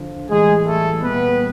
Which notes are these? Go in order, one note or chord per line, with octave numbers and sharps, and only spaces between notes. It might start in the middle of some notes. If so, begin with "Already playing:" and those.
Already playing: D3 F3
A2 E3 G3 G#3 G#4
A3 A4
A#2 G3 B3 B4